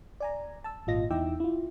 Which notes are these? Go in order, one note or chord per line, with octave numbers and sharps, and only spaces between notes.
D5 G#5 A#5
A5 E6
G#1 A#2 F4 D#5 A#6
E2 D#4 E4 G5 D6 E6
E4 F4